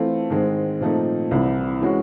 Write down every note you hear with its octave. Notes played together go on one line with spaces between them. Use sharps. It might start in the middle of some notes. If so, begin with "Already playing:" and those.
Already playing: E3 A3 C4 F4
G#2 D#3 G#3 C4
A#2 F3 A3 C4 D#4
C2 C3 E3 G3 C4
E3 G#3 C#4 F#4